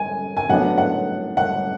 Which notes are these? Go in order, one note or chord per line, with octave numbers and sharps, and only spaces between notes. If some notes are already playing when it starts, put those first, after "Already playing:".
Already playing: G#5
G#5
A2 F#3 B3 D4 F#5
F#5
F#5